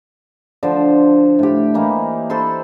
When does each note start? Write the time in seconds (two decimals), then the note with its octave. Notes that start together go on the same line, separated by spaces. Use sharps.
0.63 D3 F3 D4 C5
1.39 A2 G4
1.74 E3 A#3 D#4
2.30 A4 B4 C5 C6